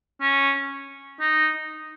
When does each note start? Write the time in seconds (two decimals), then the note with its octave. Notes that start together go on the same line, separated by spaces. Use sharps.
0.21 C#4
1.20 D#4